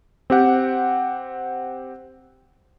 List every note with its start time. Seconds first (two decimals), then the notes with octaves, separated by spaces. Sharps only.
0.30 C4 G4 F#5